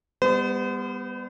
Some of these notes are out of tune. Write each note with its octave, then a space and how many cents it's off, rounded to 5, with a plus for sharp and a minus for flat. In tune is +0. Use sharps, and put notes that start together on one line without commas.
G3 +40 B3 +0 C5 -40